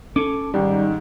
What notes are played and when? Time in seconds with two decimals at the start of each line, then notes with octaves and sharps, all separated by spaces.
0.16 C#4 A4 D6
0.54 D#2 G#2 G3 D#4 G4